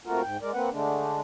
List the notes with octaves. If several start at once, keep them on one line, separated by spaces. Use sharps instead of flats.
C3 A3 A#3 F4 F#4 A#4
G#2 G5
G#3 A#4 D5
A#3 C4 B4 F#5
D3 G#3 A3 D4